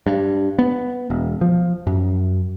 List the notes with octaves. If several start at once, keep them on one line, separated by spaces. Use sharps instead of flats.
G2
B3
E1
F3
F#2